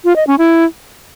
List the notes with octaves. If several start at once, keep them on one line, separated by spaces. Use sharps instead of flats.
F4
D#5
C#4
E4